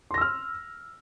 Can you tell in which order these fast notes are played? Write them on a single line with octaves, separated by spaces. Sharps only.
C6 A#6 E6 F6